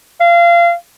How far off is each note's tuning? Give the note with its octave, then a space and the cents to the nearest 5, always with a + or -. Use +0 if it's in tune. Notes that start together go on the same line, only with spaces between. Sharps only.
F5 -25